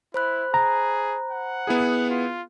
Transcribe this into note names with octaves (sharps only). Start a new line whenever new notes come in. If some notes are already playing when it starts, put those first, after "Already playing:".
E4 C5 B5 F#6
G#4 A#5
F#5
B3 E4 G#4
F4